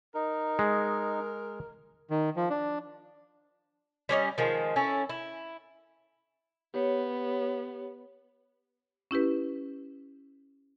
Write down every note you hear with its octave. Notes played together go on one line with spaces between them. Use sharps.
D#4 A#4
G#3
D#3
F3
D4
G3 C#4 D5 D#5
D#3 F3 G#3
C#4 E4 A4
E4
B3 G4 C#5
C#4 E4 G4 B4